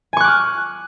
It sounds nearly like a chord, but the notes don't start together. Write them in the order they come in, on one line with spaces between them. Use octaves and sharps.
G#5 C#6 F#6 D6 F6